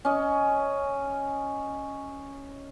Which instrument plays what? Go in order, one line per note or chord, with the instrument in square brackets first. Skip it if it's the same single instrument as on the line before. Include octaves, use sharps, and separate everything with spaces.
[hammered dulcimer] C#4 D#5